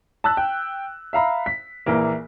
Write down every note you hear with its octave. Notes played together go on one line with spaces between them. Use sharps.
A5 E6 F#6
G5
E5 F5 A#5 B5
B6
A#1 E3 A#3